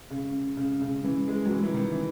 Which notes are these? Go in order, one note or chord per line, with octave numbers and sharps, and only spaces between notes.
C#3
C#3
C#3
E3
G#3
F#3
E3
E3
D#3
E3